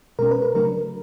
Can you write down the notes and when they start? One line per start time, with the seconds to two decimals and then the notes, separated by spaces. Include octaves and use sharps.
0.19 B2 G#3 C#4 A#4
0.31 B4
0.42 A#4
0.54 C#3 F#3 A3 D4 A#4